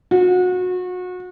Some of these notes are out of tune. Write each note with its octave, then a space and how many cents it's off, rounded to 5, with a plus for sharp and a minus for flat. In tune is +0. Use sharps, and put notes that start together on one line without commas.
F#4 -30